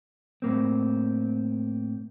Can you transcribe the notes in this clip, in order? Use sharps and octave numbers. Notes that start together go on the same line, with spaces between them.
A2 A#3 C4